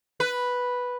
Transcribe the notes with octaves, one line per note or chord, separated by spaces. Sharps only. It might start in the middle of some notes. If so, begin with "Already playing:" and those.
B4